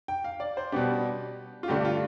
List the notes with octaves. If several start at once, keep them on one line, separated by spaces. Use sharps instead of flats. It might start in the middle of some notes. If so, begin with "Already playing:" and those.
G5
F5
D5
C5
B2 G3 B3 D4 G4
F4
G2 D3 A3 D4 G4
G4
F4